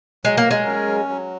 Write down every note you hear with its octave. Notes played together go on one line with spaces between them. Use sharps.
F#3 G#3
A#3
A#4
G#3
C#4
F#3
F#3